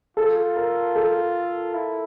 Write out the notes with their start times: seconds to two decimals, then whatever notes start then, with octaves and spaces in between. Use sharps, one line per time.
0.17 F4 A4
0.56 A#4
0.95 A4
1.74 E4